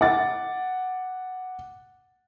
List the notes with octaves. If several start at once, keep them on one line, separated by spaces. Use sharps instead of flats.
F#5 D6 A6